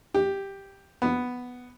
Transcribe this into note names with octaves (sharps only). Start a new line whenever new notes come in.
G4
B3